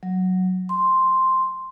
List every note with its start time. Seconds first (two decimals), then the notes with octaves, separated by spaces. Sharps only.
0.03 F#3
0.69 C6